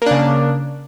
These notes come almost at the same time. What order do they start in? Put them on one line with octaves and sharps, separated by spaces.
A#3 D4 C#3